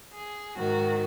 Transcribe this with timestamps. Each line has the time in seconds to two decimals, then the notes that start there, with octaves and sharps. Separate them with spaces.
0.12 G#4
0.56 G#2 D#3 F#4